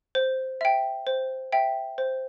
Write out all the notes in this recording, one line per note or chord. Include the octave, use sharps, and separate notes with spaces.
C5
E5 G5
C5
E5 G5
C5